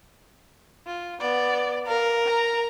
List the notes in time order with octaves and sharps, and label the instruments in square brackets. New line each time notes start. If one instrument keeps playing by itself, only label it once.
[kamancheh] F4
B3 D5
[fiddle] A#4 [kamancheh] F5
[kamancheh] A#5